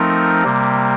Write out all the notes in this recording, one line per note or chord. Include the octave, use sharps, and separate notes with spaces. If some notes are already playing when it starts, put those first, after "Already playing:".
Already playing: F3 A3 C4 D#4 A#4
C3 G3 A#3